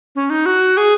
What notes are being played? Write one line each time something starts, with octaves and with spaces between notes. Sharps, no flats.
C#4
D#4
F#4
G#4